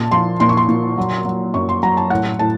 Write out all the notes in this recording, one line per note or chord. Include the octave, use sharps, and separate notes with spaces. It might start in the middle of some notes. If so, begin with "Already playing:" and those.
Already playing: A#2 A5
F3 C6
A#2 C6
C#6
C6
A#2
F#3
F#3
F#2 C#6
C6
F#3 A#5
A5
A2 F#5
A2 A5